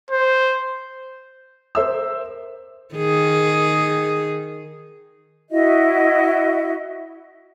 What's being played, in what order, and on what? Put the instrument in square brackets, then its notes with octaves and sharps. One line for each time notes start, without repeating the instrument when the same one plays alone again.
[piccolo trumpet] C5
[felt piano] A#4 C5 E5 E6
[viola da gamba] D#3 G#4
[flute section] E4 F#4 D#5 E5